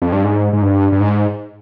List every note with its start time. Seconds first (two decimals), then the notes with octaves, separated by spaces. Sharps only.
0.02 F2
0.12 G2
0.24 G#2
0.53 G#2
0.62 G2
0.92 G2
1.00 G#2